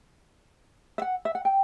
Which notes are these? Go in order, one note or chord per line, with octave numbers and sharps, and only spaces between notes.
E5
F#5
E5
F#5
G5